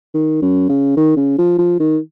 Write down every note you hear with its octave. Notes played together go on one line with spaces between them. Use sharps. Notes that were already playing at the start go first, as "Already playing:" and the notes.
D#3
F#2
C#3
D#3
C#3
F3
F3
D#3